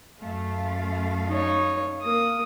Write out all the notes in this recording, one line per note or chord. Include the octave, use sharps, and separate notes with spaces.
F#2 A3 F5
D#4 C#5
A#3 D#6